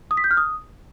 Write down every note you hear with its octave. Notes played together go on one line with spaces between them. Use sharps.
D#6
B6
G6
F6
D#6